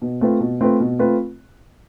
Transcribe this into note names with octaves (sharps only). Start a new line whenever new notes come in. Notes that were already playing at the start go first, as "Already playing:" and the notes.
B2
A3 C4 F4 B4
B2
A3 C4 F4 B4
B2
A3 C4 F4 B4